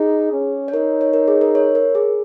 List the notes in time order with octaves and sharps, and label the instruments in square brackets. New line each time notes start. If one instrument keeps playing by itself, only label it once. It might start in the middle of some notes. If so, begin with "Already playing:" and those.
Already playing: [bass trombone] D#4 [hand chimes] G#4
[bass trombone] C#4
[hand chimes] C#5
[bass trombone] D#4 [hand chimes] A#4
[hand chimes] C#5
A#4
G#4
A#4
C#5
A#4
G#4